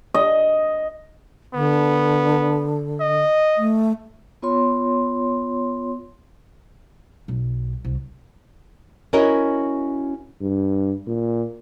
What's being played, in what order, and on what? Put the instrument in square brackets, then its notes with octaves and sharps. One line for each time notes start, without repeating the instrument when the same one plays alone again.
[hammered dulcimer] D#5
[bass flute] D3 [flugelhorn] B3
[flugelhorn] D#5
[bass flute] A3
[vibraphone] B3 F4 C#5 C6
[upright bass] B1
C2
[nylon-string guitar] C#4 E4 F#4 A#4 C#5 D#5
[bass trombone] G2
A#2